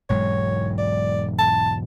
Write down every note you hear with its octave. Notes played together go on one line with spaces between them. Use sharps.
E1 G#2 F#3 C#5
D5
A5